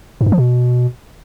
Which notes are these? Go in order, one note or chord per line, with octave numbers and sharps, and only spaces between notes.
G#2
G2
F3
B2